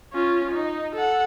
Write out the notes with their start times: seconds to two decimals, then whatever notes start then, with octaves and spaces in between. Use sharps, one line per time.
0.13 C#4 F4
0.51 D#4
0.95 A4 F#5